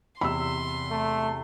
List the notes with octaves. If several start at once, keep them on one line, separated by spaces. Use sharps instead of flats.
E2 C3 B5 C6 E6
A3